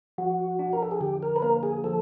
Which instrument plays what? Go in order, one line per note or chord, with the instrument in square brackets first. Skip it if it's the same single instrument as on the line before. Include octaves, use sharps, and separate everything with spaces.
[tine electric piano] F3 [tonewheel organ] F#4
[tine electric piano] D4
[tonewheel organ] A#4
A4
G#4
[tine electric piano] D3 [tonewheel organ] G4
[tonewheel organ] A#4
B4
[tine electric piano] A#3 [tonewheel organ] A#4
[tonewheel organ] G#4
[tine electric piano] F3 [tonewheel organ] A4